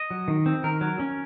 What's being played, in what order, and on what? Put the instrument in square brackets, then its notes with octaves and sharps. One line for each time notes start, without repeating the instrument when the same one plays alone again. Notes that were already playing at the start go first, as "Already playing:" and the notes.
Already playing: [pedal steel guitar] D#5
F#3
D#3
C4
D#3 A#4
F#3
C#4